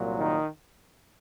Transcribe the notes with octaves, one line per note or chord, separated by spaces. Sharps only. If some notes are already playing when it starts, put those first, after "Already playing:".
Already playing: C2 A#2 F#3
D#3 D#4